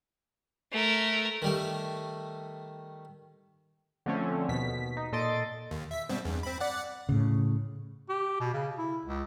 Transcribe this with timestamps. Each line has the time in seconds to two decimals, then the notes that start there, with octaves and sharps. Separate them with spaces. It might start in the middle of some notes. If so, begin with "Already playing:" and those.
0.72 A3 A#4
1.42 D#3 G3 A3
4.06 D3 F3 A3 C4 C#4
4.48 D#2 B2 B6
4.97 D#4
5.12 A#2 A4 D#5 C6 A6 D7
5.71 D#2
5.91 E5 B6
6.09 G2 B2 C4
6.25 E2 G2
6.43 C4 B5
6.60 D5 F#5
7.09 A2 C#3
8.09 G4
8.40 B2
8.54 C#3
8.78 E4
9.05 C#2